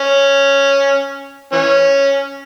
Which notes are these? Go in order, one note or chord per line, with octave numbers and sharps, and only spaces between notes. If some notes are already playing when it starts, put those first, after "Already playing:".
Already playing: C#4
E3 C#4